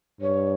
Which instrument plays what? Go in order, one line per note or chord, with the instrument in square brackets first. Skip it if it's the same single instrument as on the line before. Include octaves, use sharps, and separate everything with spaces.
[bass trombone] G2 [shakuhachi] C#5